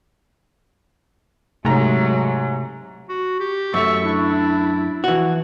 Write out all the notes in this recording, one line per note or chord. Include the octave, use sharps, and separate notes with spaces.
G#2 C3 F#3 G#3 A3 A#5
F#4
G4
F#2 A3 E5 C#6
D4 E4
E3 F3 F#4